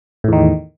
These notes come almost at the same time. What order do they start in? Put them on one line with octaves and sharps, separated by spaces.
A2 E2 D#3